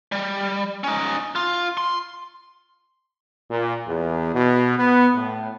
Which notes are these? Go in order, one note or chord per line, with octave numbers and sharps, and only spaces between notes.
G3
C#4 D#4
F4
C6
A#2
E2
B2
B3
A2